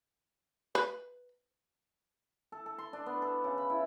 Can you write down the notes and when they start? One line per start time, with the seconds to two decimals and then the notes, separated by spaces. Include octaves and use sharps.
0.75 B4
2.52 A4
2.66 A4
2.78 C6
2.93 D4
3.06 B3
3.22 A4
3.44 C#3
3.58 B5
3.70 E4